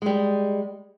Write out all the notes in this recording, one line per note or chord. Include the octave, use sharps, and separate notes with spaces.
G3 G#3